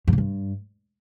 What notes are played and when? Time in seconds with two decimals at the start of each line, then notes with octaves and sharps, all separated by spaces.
0.08 G2
0.13 C#3
0.18 G2